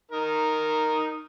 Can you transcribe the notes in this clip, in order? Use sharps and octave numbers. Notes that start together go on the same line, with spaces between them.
D#4 A#4